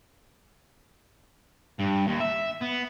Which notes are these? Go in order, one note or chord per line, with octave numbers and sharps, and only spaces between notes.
G2
D#2
E5
B3